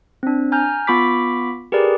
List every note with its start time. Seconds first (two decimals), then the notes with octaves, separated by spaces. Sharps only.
0.23 C4 D4
0.52 G#5 A#5 F6 G6
0.87 B3 F4 B5 C#6 D6 B6
1.72 G4 G#4 A#4 B4 D5